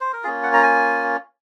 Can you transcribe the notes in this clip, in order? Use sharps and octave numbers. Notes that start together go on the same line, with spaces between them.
C5
A#4
A#3 C#4 F4 G#4
F#5
A#5
G#5